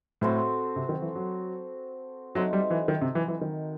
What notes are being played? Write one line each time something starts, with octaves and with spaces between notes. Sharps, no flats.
A2 C4 F#4 A4 C5
C3
D#3
E3
F#3
F#3 A3 C4 D#4 F#4
G3
E3
D#3
C3
E3
E3
D#3